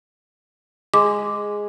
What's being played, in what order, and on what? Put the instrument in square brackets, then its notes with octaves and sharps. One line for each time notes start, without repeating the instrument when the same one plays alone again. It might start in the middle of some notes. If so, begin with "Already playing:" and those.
[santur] G#3 [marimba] D6